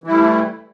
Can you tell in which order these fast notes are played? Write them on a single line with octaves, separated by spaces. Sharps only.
E3 E4 G3 A3